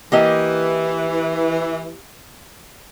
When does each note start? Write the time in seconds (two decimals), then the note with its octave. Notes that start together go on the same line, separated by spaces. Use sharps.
0.12 E3 A#3 G4 D#5